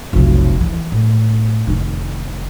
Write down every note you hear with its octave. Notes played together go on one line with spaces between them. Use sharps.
F1 B1
E3
A2
F1 D#3